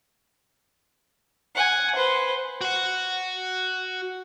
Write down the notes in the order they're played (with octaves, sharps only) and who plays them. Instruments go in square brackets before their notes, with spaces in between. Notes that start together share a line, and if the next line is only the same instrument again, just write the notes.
[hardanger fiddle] F#5 G#5
B4 C5
[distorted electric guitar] F#4 F#5